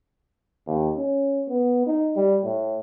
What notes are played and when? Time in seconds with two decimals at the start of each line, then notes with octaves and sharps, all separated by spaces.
0.67 D#2
0.97 C#4
1.48 B3
1.87 D#4
2.16 G3
2.44 A2